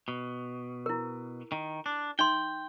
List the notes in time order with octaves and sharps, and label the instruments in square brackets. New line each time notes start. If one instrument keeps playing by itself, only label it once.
[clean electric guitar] B2
[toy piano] E4 A#4
[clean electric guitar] D#3
D4
[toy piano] D#4 E5 C6 [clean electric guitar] G5